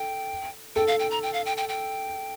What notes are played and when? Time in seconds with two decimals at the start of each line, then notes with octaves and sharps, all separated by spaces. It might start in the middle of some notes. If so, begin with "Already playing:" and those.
Already playing: A4 G5
0.76 A4 G5
0.88 F5
0.99 G5
1.11 A#5
1.23 G5
1.34 F5
1.46 G5
1.57 G5
1.69 G5